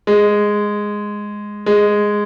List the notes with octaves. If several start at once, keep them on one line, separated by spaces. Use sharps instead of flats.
G#3
G#3